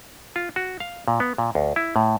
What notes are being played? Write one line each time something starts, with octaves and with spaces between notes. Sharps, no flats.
F4
F#4
F5
A#2
B3
A#2
D2
E4
A2